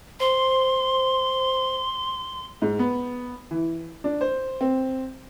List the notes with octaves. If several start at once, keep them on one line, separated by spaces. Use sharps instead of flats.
C5 C6
G#2
B3
E3
D4
C5
C4